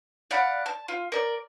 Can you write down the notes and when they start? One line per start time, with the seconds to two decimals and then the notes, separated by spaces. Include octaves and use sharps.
0.31 D5 F5 F#5 B5
0.66 A5
0.88 F4
1.12 A#4 D5